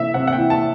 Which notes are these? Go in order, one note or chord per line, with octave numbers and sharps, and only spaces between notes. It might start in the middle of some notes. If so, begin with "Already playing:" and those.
Already playing: C3 E3 A3 E5
C3 F#5
F#5
G5
E3
A5